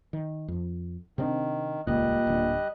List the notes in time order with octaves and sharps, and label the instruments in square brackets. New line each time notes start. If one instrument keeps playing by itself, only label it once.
[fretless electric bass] D#3
F2
[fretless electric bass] C3 C4 D4 [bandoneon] D#3
[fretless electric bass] D#1 C#2 [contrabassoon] A#2 [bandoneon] G3 D#5 F#6
[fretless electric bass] D1 D3